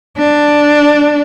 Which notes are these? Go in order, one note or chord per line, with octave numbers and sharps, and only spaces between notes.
D4